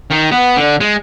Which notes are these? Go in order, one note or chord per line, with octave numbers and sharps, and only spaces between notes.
D#3
B3
D3
G#3